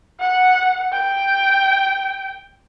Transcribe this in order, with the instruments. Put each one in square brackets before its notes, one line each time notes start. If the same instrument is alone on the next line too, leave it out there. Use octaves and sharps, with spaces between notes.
[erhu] F#5
G5